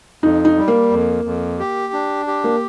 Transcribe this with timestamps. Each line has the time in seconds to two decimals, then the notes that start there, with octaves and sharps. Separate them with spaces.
0.23 F2 D#4
0.45 D#4
0.57 G3
0.68 A#3
0.91 F2
1.25 F2
1.59 G4
1.93 D4
2.27 G4
2.44 A#3